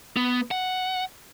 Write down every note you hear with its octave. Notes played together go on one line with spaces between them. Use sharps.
B3
F#5